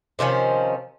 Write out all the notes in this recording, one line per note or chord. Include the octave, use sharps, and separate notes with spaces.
C3 D#3 F3 C#4